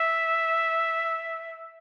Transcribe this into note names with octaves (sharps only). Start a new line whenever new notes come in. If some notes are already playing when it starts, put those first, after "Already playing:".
Already playing: E5